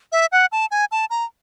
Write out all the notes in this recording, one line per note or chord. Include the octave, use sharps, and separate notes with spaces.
E5
F#5
A5
G#5
A5
A#5